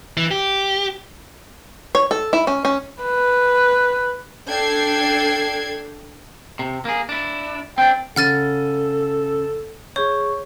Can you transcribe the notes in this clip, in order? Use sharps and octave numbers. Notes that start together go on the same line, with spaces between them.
E3
G4
C#5
A4
E4
C#4
C#4
B4
D4 A4 G5 G#6 C7
C3
A#3 G#4
D4 E4
C4 D4 G5
C#3 A4 F#5 F6 A6 D#7
G#4 C#5 C#6 G6